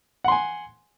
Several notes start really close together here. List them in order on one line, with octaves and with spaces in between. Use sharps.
F#5 C6 G#5